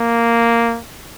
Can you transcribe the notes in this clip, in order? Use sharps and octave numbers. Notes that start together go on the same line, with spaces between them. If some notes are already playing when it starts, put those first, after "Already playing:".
Already playing: A#3